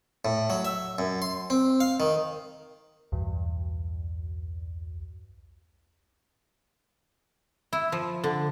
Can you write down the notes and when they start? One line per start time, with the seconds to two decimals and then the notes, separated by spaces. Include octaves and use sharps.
0.25 A2
0.50 F#3
0.65 E5
0.99 F#2
1.22 C6
1.50 C4
1.81 F5
2.00 D#3
3.12 B1 E2 G2
7.73 E4
7.92 F3
8.24 D3